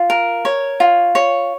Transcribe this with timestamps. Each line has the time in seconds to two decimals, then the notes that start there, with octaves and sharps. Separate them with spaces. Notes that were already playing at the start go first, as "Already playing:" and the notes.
Already playing: F4
0.10 A#4
0.45 C#5
0.80 F4
1.15 C#5